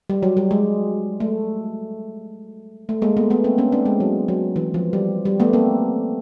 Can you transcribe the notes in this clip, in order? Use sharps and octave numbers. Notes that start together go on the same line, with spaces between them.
G3
F#3
G3
G#3
A3
A3
G#3 A#3
A3 B3
A3 B3
A#3 C4
B3 C#4
C4 D4
G#3
F#3
F#3
E3
F3
G3
G3
A3 B3
A#3 C4